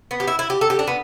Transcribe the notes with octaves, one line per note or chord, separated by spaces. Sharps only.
B3
G4
E4
E4
G4
A4
G4
D4
B3